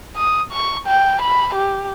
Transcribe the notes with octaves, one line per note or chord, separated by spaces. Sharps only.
D#6
C#6
G5
B5
G4